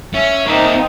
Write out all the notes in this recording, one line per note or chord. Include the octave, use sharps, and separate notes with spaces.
C#4 E5
A#3 C4 D#4 E5